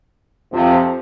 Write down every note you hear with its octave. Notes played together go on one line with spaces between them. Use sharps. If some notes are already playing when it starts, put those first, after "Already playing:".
F2 C3 F3